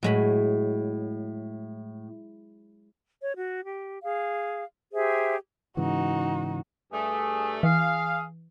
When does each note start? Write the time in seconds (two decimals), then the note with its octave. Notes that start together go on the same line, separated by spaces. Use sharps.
0.03 A2 F#3 G#3 B5
3.21 C#5
3.36 F#4
3.66 G4
4.03 G#4 F5
4.93 G4 G#4 C5 E5
5.77 G#2 C#3 E3 D#4 F#4
6.92 G2 A3 G#4
7.63 E3 G#4 F5